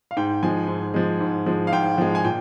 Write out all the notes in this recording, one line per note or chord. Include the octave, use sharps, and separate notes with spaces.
F5
G#2 G5
F3 G#3 G#5
G#2
F3 G#3
G#2
F3 G#3
F5
G#2 G5
F3 G#3
G#5
A#2 G5